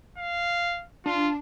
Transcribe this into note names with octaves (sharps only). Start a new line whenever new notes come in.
F5
D4 F4